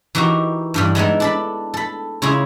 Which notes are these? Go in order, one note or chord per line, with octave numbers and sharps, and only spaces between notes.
E3 D#4 F#4 G4 A#4
G2 E3 G3
G#3 B3 D#4 E4
D4 A4 B5
A4 B5
C#3 E4 F4 G#4